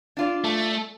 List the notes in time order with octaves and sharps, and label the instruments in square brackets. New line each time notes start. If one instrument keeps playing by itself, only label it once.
[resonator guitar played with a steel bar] D4 F4 D5
[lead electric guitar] A3